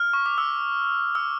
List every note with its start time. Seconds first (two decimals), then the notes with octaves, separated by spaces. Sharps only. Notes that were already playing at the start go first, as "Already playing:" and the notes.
Already playing: F6
0.13 C#6
0.26 D6
0.38 E6
1.15 E6